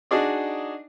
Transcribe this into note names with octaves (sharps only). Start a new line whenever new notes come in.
D4 D#4 F#4 G#4 D5 D#5